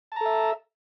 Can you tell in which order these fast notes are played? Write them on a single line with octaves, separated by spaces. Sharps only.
A5 A#5 A4 E5